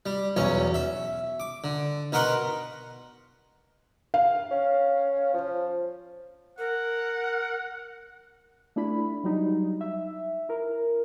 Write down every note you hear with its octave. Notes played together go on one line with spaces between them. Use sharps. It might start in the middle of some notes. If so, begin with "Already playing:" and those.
G3
B1 E2 C#4 C#5
E5
D6
D3
B2 A#4 B4 F#5 C6 C#6
F5
C#4
F3
A#4 F#5
A3 D4 E4 B5
F#3 G3 D#4
E5
E4 A#4